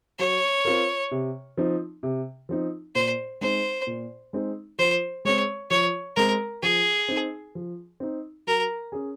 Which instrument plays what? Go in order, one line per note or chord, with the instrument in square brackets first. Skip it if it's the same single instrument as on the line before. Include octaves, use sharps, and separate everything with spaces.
[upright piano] F#3 [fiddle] C#5
[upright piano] C4 F4 A#4
C3
F3 C4 D#4
C3
F3 C4 D#4
[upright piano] A#2 [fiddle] C5
[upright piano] G#3 C4 D#4 [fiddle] C5
[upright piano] A#2
G#3 C4 D#4
[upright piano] F3 [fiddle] C5
[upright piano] G#3 C4 [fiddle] C#5
[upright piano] F3 [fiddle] C#5
[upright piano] G#3 C4 [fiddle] A#4
[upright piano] F3 [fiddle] G#4
[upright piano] C4 D#4
F3
C4 D#4
[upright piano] F#3 [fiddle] A#4
[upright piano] C#4 G#4